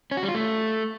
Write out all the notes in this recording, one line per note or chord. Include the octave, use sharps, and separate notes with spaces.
C#4
F#4
G3
F4
A3